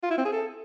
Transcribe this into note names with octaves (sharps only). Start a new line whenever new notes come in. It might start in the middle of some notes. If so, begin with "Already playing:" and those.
F4
E4
C4
G#4
A4